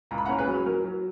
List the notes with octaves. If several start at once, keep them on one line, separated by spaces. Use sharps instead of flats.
C#2 A#5
B5
F#5 A#5
C#4
G#4 B4
F#3
F#3 A#4
F#3